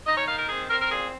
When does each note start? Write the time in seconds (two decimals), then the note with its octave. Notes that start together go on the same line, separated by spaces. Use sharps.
0.07 D#4 D#5
0.17 C#5
0.28 D#3 F5
0.39 A#4
0.49 C4 G#4
0.70 C4 A#4
0.81 A#4
0.91 A#2 G#4